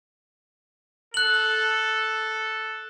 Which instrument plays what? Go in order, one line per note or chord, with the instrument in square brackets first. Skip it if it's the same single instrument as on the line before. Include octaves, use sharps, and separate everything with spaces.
[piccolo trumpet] A4 [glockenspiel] F#6 F#7